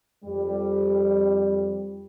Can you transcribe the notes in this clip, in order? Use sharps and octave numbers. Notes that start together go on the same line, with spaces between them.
F2 G3